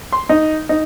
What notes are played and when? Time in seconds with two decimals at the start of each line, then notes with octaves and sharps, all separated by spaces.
0.13 C6
0.29 D#4
0.69 D#4